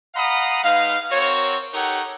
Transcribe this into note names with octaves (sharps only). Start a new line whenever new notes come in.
D#5 F5 F#5 A#5 B5 D#6
G#3 D#4 B4 F5
C4 F#4 A#4 C#5
D#4 G4 A4 A#4 C#5 F#5